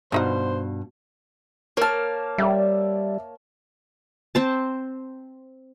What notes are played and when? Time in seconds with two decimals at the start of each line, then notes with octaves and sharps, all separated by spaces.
0.12 G2 B2 F3 D#4 C5 F#5
1.77 A#3 C#5 A5 F6
2.38 G3 D5 E5
4.35 C4 C5 A5